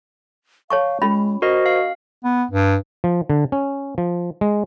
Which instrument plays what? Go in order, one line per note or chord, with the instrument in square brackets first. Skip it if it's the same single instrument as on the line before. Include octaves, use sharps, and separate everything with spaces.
[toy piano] C#5 A5 C#6 [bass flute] F5
[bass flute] G#3 [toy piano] C#4 F4 B5
[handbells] F#4 A#4 D#5 [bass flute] C5
[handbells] F5
[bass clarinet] B3
G2
[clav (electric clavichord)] F3
D3
C#4
F3
G#3